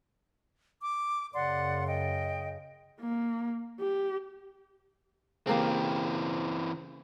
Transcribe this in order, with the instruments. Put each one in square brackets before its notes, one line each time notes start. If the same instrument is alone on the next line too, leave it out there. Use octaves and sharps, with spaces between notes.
[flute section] D6
[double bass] F#2 C#3 [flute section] D5 F#5 C6
[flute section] D#5 G5
[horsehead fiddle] A#3
G4
[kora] C#3 A#3 G4 [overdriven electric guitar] E3 C4